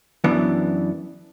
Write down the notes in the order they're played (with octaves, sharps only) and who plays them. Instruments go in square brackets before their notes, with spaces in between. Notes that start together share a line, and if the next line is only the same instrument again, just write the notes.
[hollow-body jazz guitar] F#2 E3 B3 D4